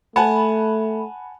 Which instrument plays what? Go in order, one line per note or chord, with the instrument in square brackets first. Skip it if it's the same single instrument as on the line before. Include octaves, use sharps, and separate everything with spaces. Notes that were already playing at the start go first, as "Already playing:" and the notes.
[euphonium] A3 [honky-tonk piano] F#5 G#5 A5 [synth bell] B5